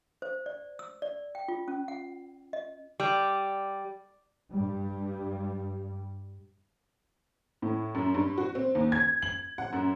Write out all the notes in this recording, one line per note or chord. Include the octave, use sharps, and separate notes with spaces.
C5
D5
E6
D5
G5
F4
C#4
F#5
D#5
G3
G2 G3
A2
F#2
G2
F#4
C4
D#2
G#6
F#7
F#5
F#2